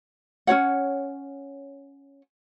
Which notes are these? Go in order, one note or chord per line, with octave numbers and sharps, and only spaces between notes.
C#4 F#4 C#5 F#5